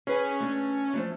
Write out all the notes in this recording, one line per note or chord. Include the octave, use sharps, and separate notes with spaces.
C#4 G#4 B4 G#5
A3 D4
F3 A3 D4